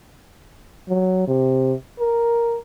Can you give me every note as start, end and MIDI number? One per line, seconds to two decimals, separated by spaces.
0.89 1.26 54
1.28 1.73 48
1.99 2.57 70